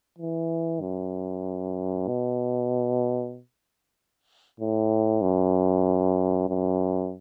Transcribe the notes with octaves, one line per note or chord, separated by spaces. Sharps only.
E3
F#2
B2
A2
F#2
F#2